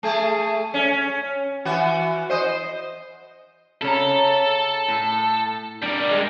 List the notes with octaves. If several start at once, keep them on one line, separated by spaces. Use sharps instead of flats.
A3 G#4
C#4
E3 F#4
C5 D#5
C#3 A4 C#5 A#5
A2
G3 D4 A#4
G#3